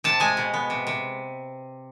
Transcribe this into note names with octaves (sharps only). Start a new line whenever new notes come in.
C3 A5
G#3 G#5
B2
B3
C3
C3